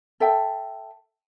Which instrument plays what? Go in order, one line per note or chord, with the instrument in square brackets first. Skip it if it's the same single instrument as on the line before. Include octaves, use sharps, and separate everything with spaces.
[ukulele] A4 E5 G5